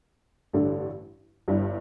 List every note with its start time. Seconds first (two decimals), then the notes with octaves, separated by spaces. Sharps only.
0.53 A1 G2 D3 A3 D4
1.48 G1 G2 G3 E4